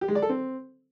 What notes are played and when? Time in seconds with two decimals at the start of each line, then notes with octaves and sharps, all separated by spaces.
0.01 G4
0.08 G#3
0.15 D5
0.22 A4
0.29 C4